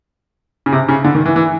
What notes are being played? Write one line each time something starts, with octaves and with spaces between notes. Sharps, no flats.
C#3
C3
C#3
D3
D#3
E3
E3